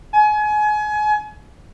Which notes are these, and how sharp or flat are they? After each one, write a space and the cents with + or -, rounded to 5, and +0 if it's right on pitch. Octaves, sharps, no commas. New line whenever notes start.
G#5 +30